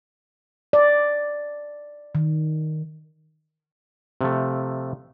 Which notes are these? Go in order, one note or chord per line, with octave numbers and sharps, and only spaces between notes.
D5
D#3
C3 F3 A3